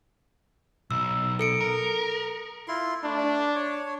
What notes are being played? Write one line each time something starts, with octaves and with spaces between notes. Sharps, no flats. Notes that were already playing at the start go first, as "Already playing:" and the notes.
B1 E6
A4 C#7 D7
A#4
E4 F4 C6
A3 D4
C#5